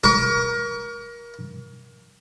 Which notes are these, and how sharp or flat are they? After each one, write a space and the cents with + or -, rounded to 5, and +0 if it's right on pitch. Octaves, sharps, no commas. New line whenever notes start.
A#4 +25 C#6 +45